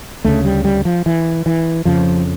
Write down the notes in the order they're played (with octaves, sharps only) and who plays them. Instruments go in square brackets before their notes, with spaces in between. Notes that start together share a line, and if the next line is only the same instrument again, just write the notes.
[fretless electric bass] D2 C#3 A3
G3
G3
F3
E3
E3
F2 C#3 F3